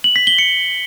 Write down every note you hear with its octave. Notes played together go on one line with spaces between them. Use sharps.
F#7
B6
G7
C#7